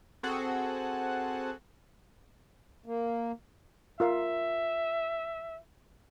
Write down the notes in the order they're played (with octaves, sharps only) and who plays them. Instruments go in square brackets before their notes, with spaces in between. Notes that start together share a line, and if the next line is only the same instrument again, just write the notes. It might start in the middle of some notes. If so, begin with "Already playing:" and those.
[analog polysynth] C4 F#4 G#4 A4 F#5
[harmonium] A#3
[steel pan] F4 A#4 F5 [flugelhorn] E5